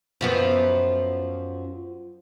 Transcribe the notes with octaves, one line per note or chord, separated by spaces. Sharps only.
F#2 F3 B3